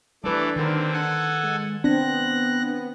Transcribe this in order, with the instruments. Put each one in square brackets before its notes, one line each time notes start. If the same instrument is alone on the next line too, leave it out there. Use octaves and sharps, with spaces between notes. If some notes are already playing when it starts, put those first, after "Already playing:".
[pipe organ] E3 A3 D5 [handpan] G3 B4 [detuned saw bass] D4
[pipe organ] D3 C4 [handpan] D#3 A#4
[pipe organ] A4 F#5 G#5
[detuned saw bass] G#3
[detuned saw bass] B3 [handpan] C4 [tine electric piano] D4 [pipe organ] F#6 A#6